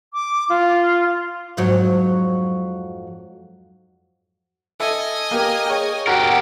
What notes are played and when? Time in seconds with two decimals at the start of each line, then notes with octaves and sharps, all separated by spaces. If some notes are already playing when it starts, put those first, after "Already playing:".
0.13 D6
0.49 F4
1.57 F2 G#2 F#3
4.80 A4 D#5 E5 G#5
5.31 A#3 G4 A#4
5.66 G#4 C#5 G5
6.07 F#4 G4 A#4 F#5